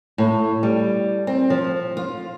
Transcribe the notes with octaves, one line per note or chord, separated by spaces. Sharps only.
A2
G3
C4
F3
F4